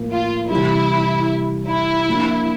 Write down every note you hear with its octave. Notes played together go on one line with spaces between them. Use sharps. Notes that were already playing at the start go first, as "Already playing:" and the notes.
Already playing: A2 F3 A#3
F4
C3 E3 G3 E4
E4
F3 A#3 D4